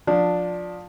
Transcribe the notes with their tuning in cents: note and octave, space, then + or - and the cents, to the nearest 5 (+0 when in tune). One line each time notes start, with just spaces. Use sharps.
F3 +25 D4 +0